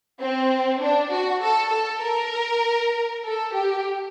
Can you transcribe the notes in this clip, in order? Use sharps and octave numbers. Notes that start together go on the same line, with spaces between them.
C4
D4
F#4
A4
A4
A#4
A4
G4